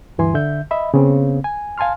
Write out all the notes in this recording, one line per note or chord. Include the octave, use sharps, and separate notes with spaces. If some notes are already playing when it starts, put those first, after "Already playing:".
D2 G2 E3 G#5 C6
D3 E5 G6
D#5 E5 B5
C#3 B3 C4
G#5
F5 G#5 A5 C6 F6